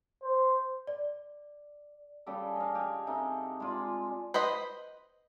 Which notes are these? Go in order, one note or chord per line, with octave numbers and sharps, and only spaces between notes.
C5
D5
C#3 G3 G4 A4
D#5 F5
G4 G#5
C3 D#4 A4
G#3 F4 D5
B4 C5 D#5 B5